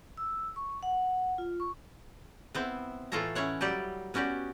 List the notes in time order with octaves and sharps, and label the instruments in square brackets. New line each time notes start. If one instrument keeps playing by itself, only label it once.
[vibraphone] E6
C#6
F#5
F4
C#6
[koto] B3 C4 E4
A2 E3 F4 A4 C#5 A#5
C#4 E4 C#5 F#5
F#3 G3 G4 D5
B3 C#4 F#4 G4 D5